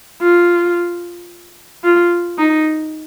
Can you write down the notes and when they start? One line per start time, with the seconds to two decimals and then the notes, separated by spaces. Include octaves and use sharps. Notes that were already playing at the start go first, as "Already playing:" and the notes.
0.22 F4
1.84 F4
2.38 D#4